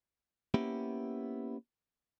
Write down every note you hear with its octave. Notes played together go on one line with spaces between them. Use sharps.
A#3 B3 C#4 E4 G4